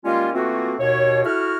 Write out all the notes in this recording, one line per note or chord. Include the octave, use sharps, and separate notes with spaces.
D#3 G3 G#3 A#3 C#4 F4
E3 A3 A#3 C4 F4 F#4
D#2 B2 C#5
E4 F#4 A4 F6